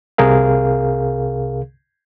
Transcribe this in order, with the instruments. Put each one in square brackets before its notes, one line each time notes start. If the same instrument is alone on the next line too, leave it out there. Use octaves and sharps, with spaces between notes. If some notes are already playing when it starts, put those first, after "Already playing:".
[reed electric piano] C2 C3 G#4 A#4 F5